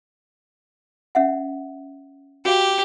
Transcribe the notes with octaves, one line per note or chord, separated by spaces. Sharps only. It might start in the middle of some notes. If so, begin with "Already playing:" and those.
C#4 E5 F#5
F#4 G4 F5